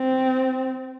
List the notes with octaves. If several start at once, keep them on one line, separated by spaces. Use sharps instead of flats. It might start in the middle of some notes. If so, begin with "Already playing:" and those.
Already playing: C4